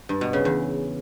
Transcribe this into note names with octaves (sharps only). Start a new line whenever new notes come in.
G2
B2
C#3
E2